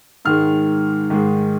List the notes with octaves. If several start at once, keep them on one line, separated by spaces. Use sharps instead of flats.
G#2 D#3 G#3 F6
G#2 D#3 G#3